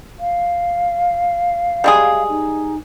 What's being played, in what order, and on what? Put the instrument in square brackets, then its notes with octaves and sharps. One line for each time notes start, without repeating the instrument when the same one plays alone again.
[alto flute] F5
[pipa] G3 G#3 G#4
[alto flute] D#4